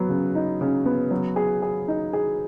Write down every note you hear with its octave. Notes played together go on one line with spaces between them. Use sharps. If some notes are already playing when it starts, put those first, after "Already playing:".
Already playing: F#3 B3
C#3
D#4
C#3
B3
F#3
G#4
G#4
D#4
G#4